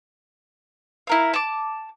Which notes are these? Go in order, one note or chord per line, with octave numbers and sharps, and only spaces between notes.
E4 A#4 F5
A5 D6